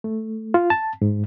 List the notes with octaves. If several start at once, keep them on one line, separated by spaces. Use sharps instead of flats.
A3
F4
A5
G#2